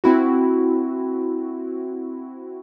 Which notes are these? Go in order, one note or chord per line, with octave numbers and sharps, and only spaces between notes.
C4 E4 F#4